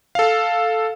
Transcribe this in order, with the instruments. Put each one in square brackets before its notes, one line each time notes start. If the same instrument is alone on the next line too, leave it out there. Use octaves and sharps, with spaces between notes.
[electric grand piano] A4 F5